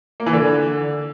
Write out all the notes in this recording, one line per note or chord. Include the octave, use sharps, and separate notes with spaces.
A#3
E3
D3